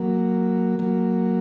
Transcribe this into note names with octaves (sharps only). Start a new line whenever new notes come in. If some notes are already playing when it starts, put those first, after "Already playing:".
Already playing: F#3 A#3
F#3 A#3